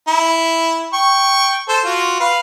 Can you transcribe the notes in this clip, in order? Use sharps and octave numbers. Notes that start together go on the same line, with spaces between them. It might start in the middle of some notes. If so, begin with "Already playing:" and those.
E4
G5 C#6
A4 C5
F4 F#4
B4 F5